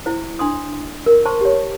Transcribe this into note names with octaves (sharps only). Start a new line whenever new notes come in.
E4 C5
D4 C6 D#6
A#4
C5 A5 C6 C#6
G4 C#5